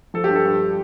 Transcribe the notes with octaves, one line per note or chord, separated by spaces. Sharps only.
F3 A4
G4
G2
A4
G2